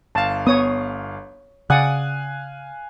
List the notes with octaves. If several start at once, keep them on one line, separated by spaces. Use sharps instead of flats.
G1 F5 A5
B3 C#5 D#6
C#3 D5 F5 F#5 G#5 D#6 F#6